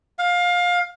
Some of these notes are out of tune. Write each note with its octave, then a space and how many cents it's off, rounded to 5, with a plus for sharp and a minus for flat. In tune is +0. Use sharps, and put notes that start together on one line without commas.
F5 +20